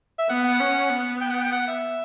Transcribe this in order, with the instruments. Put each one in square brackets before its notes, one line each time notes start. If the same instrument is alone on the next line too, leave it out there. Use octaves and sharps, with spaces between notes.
[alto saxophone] E5
[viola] B3 [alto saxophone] F#5
[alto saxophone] F#5
[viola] C#4
B3
[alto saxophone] G5
F#5
G5
F#5
E5